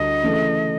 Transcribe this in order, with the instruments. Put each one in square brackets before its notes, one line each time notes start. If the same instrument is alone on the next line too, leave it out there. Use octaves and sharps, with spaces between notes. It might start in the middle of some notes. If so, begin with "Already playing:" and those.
Already playing: [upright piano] D2 G3 [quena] D#5
[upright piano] C#3 E3 A3